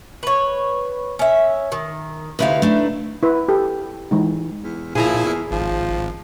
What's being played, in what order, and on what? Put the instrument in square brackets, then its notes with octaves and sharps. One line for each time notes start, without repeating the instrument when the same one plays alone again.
[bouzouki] B4 C#5
C#4 E5
D#3
[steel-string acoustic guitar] D2 C3 F5 [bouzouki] D#4 E4 B4
[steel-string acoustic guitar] A3 D4
[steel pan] E4 B4
G4 A4
E3 G#3 D#4
[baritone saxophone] E2
[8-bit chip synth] A#2 E4 [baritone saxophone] F3 [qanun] G#4 A#5
[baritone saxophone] E2
[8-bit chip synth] G#1 [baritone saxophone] F3